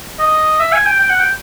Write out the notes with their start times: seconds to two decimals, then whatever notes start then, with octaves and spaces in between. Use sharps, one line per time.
0.19 D#5
0.59 E5
0.72 G#5
0.86 G5
1.00 G5
1.10 F#5
1.20 G5